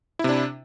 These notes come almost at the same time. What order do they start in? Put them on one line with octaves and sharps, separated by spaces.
E4 C3 D4